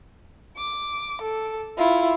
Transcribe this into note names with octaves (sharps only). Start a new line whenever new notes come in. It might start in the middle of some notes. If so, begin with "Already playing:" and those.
D6
A4
E4 F4